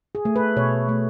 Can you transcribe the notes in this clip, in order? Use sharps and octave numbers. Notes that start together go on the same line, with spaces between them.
G#4
A3
B4
B2 C#5
A3